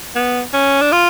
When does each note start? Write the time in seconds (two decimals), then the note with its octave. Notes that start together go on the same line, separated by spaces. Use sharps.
0.16 B3
0.53 C#4
0.82 D4
0.92 F4